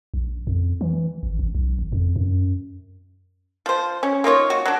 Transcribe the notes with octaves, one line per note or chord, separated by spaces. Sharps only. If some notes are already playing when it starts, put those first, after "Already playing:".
A#1
F2
E3
G#1
A1
B1
G#1
F2
F#2
F3 C5
C#4
A#3 D#4 F4 C#5
F#4
F#3 D4